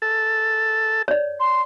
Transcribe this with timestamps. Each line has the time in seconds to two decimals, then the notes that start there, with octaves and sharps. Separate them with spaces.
0.02 A4
1.08 C#5 D5
1.40 C6